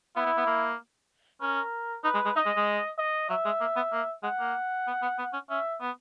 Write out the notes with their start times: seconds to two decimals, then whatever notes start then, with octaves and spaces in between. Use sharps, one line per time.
0.16 B3 E4
0.26 B3
0.37 B3
0.47 A#3
1.41 C#4 A#4
2.04 D#4 B4
2.14 G#3
2.25 G#3
2.36 D#4 D#5
2.46 G#3
2.57 G#3
2.98 D#5
3.29 F#3 E5
3.45 G#3
3.61 A#3
3.76 B3
3.92 A#3
4.23 G#3 F#5
4.40 A#3
4.87 B3
5.02 B3
5.18 B3
5.33 C#4
5.50 C#4 E5
5.81 B3